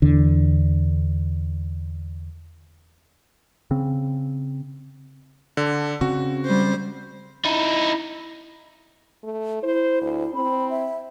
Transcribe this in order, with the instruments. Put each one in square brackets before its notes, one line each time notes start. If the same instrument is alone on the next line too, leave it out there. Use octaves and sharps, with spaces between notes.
[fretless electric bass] E2 D3
[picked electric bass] C#3 C4
[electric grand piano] D3
[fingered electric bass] C#3 C4 [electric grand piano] F#4
[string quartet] G3 C5
[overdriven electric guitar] D#4 E4
[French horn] A3
[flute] E4 [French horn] C5
[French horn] D2
[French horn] C4 [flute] B5
[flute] E5